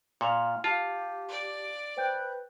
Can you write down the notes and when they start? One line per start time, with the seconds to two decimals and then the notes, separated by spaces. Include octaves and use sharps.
0.21 A#2 F4 C#7 E7 F7
0.64 F4 G4 F5 A5
1.28 D5
1.97 B4 C5 G5 G6